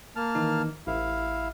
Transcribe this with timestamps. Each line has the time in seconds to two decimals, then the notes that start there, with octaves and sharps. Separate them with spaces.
0.16 A#3 A5 F6
0.35 D#3 E3 D#4
0.87 A1 E4 F5